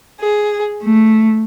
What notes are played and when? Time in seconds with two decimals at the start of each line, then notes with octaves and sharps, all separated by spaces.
0.21 G#4
0.82 A3